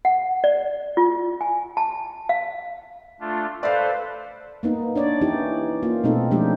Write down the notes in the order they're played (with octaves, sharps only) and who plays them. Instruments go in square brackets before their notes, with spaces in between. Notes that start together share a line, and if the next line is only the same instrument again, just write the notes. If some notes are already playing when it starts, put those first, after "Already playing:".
[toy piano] F#5
D5
F4
G#5
A5
F5
[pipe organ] A3 D4 F4
[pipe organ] A4 B4 C5 [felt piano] D5 F5
[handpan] A#3 B3 D#4
D4 C#5 D5
E3 C#4 D#4 E4 G4
A#3 F4
B2 A3 C4 D#4 A4
F3 G#3 A3 C#4 D4 G4